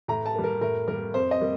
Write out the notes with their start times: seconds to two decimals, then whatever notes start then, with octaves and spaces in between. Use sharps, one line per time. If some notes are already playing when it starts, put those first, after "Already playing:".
0.08 A2 A#5
0.26 A5
0.35 G3 A#3
0.44 A#4
0.61 A2 A#4
0.88 G3 A#3 A#4
1.14 F2 C5
1.31 D#5
1.41 G3 A#3